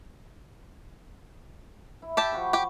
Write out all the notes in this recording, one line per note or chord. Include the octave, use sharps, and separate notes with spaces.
E4
G4 E5 A5
F3 F#4 B5
G4 G5